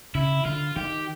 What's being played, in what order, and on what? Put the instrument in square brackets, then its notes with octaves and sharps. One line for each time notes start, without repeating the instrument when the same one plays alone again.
[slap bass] C#3 [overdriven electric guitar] E4
[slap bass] D3 [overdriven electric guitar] F4
[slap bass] D#3 [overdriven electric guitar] G4